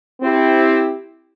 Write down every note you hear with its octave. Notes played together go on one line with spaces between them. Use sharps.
C4 E4 G4